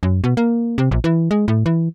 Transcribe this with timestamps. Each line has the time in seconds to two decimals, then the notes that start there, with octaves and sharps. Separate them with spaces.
0.03 F#2
0.24 B2
0.37 A#3
0.78 C3
0.91 A#1
1.04 E3
1.31 G#3
1.48 A2
1.66 E3